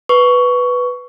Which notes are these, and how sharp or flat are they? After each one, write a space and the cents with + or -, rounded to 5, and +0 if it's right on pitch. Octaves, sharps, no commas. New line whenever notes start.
B4 +0 C#6 +15